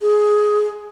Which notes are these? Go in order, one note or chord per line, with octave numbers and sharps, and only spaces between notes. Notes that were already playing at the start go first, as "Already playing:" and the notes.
G#4